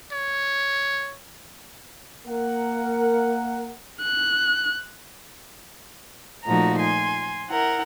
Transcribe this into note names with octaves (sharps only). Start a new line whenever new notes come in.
C#5
A#3 A#4 F#5
F#6
A#2 F3 A3 D#4 F#4 A#5
G#5 C6
E4 A#4 F#5